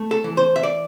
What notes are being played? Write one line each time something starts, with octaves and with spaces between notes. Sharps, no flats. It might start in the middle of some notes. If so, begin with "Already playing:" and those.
Already playing: A3
A4
E3
C5
E5
D5